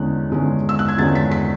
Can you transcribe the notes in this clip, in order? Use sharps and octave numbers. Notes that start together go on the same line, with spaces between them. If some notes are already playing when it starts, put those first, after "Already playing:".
Already playing: E2 D3 G#3 C#4 F#6
E2 D3 G#3 C#4
E6
F#6
G#6
E2 D3 G#3 C#4 A6
B6
B6